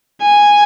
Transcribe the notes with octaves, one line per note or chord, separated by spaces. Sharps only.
G#5